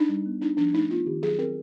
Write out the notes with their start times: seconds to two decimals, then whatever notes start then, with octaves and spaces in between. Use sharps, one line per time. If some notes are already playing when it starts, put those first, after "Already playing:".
Already playing: D4 D#4
0.09 G3
0.26 B3
0.41 D4 D#4
0.57 F3 D4
0.73 A3 D#4
0.90 B3 F4
1.06 D#3 G4
1.22 F#3 G#4
1.38 C4 A#4